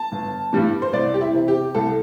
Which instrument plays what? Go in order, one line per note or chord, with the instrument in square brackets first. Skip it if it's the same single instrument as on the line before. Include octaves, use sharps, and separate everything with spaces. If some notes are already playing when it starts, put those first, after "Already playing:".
Already playing: [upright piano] A5
G1
G2 E3 G3 D4
C5
C2 D5
G4
E4
C3 E3 C4
G4
C2 A4